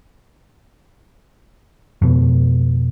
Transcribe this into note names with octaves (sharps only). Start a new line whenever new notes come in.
F2 B2